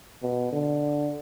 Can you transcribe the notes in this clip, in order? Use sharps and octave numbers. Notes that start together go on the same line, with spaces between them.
B2
D3